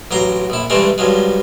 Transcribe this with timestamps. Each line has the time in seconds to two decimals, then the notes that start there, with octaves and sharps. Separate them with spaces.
0.11 A1 F#3 A#5 C6
0.50 A#1 E4
0.70 G2 C3 E3 G#3 A3 C4
0.98 G2 F3 F#3 G#3